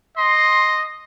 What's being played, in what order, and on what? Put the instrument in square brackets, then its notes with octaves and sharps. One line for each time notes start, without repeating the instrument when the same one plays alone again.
[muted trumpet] D#5 [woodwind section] C6